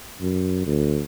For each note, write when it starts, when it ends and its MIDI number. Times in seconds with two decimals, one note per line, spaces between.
0.21 0.65 42
0.66 1.01 38